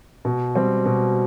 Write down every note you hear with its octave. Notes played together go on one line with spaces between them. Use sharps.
B2
G3 C4
B2